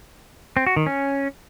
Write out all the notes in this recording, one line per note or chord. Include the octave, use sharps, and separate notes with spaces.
C4
F#4
D#3
C#4